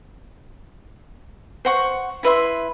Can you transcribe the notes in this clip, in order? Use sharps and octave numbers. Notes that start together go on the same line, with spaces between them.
C5 F#5 C#6
E4 B4 E5 C6